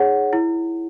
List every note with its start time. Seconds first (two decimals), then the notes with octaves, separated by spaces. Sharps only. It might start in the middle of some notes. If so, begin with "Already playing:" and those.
Already playing: D#4 G#4 C#5 F#5
0.33 E4